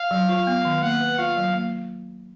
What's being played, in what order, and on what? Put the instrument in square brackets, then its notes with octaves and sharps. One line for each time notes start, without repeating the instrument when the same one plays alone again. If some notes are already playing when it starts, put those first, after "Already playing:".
Already playing: [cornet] F5
[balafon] F#3
F4
B3
D#3
[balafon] A#3 [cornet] F#5
[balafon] B4
[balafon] F4 [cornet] F5
[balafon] F#3
A#3